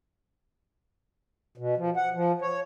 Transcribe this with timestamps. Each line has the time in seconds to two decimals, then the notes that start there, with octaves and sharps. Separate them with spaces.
1.58 B2
1.77 F3
1.97 F#5
2.14 F3
2.42 C#5